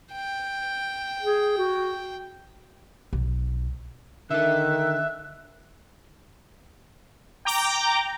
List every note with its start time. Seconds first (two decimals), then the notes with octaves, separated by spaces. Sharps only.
0.13 G5
1.23 G#4
1.58 F#4
3.13 B1
4.30 D3 D#3 A4 E5 F#6
7.45 G5 A#5 D6 G6